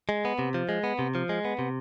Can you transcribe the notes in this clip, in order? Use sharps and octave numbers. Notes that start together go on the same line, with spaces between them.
G#3
B3
C3
F3
G#3
B3
C3
F3
G#3
B3
C3